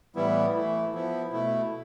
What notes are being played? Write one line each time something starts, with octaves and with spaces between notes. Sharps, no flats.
A2 E3 G3 B3 E4
E3 A3 E4
F3 B3 E4
B2 A3 E4